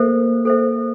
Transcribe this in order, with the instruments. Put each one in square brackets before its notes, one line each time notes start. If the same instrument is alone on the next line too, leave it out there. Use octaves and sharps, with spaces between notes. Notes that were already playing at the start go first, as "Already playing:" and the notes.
Already playing: [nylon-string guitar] A#3 [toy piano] A4 C5 E5
[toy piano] A4 C5 E5